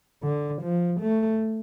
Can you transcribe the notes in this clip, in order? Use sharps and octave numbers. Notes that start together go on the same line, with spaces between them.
D3
F3
A3